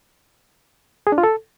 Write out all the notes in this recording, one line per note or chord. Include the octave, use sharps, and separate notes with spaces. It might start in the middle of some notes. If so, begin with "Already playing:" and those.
G#4
D4
F4
A4